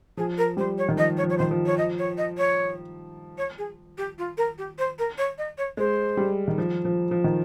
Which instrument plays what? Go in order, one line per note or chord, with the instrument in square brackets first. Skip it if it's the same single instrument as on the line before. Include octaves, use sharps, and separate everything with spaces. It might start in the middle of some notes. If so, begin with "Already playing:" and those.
[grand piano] F3 [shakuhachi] G#4
[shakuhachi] A#4
[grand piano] G3 [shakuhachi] C5
[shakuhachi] C#5
[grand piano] D#3
[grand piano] F3 [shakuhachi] D#5
[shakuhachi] C#5
[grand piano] F3
[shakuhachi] C#5
C5
[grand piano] D#3
F3
[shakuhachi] C#5
D#5
C#5
D#5
C#5
C#5
G#4
G4
F4
A#4
G4
C5
A#4
C#5
D#5
C#5
[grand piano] G#3 [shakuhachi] C5
[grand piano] G3
D#3
F3
F3
F3
D#3